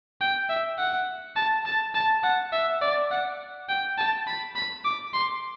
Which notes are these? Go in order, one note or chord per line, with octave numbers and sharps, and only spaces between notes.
G5
E5
F#5
A5
A5
A5
F#5
E5
D5
F#5
G5
A5
B5
B5
D6
C6